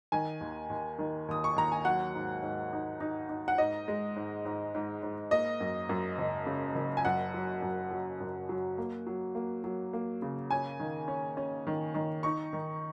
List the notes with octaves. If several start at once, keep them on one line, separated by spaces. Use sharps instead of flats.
D#3 G#5
D#2
D#2
D#3
D#2 D#6
C#6
D#2 A#5
G#5
F#3 F#5
G#2
G#2
D#4
D#4
D#4
F#5
G#2 D#5
G#3
G#2
G#2
G#2
G#2
A#3 D#5
F#2
F#2
F#1
C#3
F#1
G#5
F#2 F#5
F#3
F#2
F#3
F#2
F#3
A#3
F#3
A#3
F#3
A#3
C#3
C#4 G#5
D#3
C#4
C#4
D#3
D#3
D#4 C#6
D#3